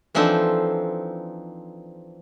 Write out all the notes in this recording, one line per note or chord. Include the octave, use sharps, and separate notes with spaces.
E3 F3 C4 D4 D#4 A4